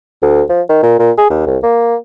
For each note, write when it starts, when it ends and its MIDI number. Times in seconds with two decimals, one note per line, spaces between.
0.23 0.42 38
0.49 0.62 53
0.69 0.81 51
0.83 0.98 46
0.99 1.11 46
1.18 1.27 68
1.30 1.46 39
1.47 1.58 36
1.63 1.96 58